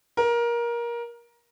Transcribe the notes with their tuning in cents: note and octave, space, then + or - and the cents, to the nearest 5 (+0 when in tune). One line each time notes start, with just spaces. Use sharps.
A#4 +20